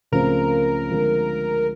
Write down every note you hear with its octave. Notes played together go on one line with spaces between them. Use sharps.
C#2 C#3 F3 A3 C4 A#4
D3 F3 G#3 C4